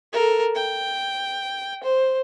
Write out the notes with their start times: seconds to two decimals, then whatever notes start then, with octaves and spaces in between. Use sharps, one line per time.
0.13 A4 A#4
0.56 G5
1.84 C5